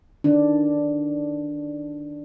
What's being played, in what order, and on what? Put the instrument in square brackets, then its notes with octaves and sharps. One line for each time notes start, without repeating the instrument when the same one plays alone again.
[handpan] D#3 D4